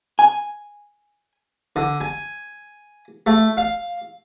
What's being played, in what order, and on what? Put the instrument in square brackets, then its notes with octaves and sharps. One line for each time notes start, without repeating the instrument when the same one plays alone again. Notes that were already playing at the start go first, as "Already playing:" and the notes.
[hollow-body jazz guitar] G#5
[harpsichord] D3
G#5
A3
F5